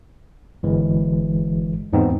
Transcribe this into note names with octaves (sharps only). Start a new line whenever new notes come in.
G1 E3 G#3
E2 G#2 B3 C4 D#4